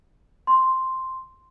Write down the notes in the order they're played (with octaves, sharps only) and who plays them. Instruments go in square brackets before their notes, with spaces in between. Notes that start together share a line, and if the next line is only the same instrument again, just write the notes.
[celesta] C6